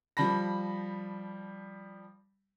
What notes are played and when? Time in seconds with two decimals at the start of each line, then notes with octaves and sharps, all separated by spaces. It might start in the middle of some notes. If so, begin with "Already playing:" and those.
0.17 F3 G3 A5 B5 A#6